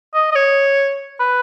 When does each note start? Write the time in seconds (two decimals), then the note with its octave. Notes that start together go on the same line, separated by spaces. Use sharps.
0.14 D#5
0.31 D#5
0.36 C#5
1.19 B4